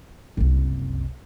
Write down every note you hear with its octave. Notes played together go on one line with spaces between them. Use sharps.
F#1 C2